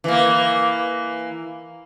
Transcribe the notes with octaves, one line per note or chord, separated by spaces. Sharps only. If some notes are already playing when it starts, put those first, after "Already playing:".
E3 A#3